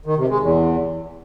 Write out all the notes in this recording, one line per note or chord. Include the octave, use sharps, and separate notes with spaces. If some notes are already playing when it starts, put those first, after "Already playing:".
D#3
C3
G#3
E2